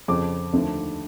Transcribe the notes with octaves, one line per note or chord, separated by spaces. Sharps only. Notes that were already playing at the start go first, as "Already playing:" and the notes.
F2 C#3 F3 D6
D#2 D3 F3 A3